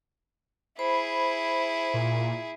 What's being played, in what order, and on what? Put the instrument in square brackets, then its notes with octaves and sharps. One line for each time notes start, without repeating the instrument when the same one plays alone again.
[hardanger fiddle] E4 G#4 [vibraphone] C5 B5
[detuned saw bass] A#2